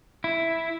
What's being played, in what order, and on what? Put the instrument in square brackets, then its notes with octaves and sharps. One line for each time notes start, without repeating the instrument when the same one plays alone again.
[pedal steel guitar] E4